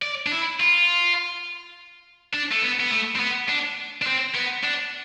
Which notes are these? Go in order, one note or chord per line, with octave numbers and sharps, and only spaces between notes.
D5
D4
E4
F4
D4
A3
B3
B3
A3
C4
B3
D4
D4
C4
B3
D4